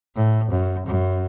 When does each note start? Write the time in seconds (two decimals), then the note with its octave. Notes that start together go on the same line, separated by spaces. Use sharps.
0.16 A2
0.51 F#2
0.87 F#2